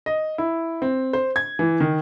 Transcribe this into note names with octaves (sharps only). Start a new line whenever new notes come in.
D#5
E4
C4
C5
G#6
E3
D#3